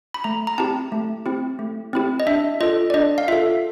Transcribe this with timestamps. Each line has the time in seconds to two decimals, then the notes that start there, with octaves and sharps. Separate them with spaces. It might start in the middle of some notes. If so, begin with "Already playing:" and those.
0.14 B5
0.24 A3 A#5
0.47 A#5
0.58 C4 E4 G4 A5
0.92 A3
1.26 C4 E4 G4
1.59 A3
1.93 C4 E4 G4
2.20 D#5
2.27 D4 E5
2.61 F4 A4 D#5
2.90 D5
2.94 D4 D#5
3.18 F5
3.28 F4 A4 E5